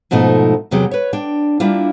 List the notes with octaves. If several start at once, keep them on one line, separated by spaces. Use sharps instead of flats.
G#2 B2 F3 A3 D#4
E2 C3 F#3 G#4 G5
B4 C#5
D4 G5
G3 A#3 D4 E4 F4